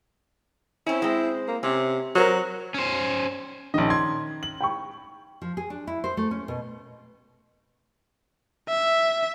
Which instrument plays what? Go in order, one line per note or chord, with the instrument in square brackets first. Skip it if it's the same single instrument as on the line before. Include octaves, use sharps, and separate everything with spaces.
[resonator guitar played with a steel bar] C4 C#4 [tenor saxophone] E4
[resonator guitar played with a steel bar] G#3 C4
[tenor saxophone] A#3
[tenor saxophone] C3 [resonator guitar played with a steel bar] C#4
[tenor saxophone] F#3 [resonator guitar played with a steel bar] A#4 C5
[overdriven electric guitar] C#4 C5
[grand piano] A#1 D#5 [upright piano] D#3 C#4
[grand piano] C6 G#6
F#7
[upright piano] G5 B5 C#6
[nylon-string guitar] F3
G#4
D4
E4
C5
A3
C#4
B2
[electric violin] E5